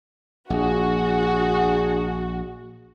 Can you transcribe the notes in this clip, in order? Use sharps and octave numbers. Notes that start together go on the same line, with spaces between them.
A#1 D4 F#4 G#4